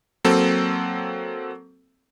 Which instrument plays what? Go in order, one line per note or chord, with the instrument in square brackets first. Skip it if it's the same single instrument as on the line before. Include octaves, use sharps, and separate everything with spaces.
[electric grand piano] F#3 A#3 C4 A4